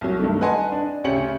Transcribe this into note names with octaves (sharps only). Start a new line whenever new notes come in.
C2 F#3
G2 D#3 A3
B4 D#5 F#5 G#5 A5 C6
D4
D2 C#3 C#4 G4 C#7 F#7